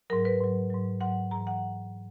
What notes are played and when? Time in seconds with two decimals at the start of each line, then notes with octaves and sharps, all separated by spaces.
0.10 G#2 F#3 A#4
0.25 B4
0.41 G#2 F#3
0.70 G#2 F#3
1.00 G#2 F#3 F#5
1.31 G#2 E3 A#5
1.47 F#5